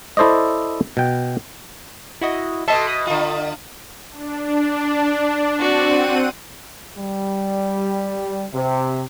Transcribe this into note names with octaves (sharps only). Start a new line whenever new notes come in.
E4 A4 C5 D5 D#5
B2 G5
E4 F#4 D#5
B2 A4 D#5 E5 A5 C6
B5 D#6
D3 F4
D4
C4 F#4 D5 F#5 D#7
G3
C3